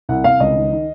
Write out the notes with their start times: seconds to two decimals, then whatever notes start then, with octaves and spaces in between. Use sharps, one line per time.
0.09 C2 F#5
0.24 C2 F5
0.40 C#2 D#5
0.56 D#3
0.72 D#3